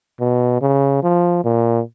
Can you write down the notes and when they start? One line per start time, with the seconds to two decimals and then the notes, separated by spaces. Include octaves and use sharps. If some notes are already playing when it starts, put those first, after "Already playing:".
0.20 B2
0.62 C#3
1.03 F3
1.44 A#2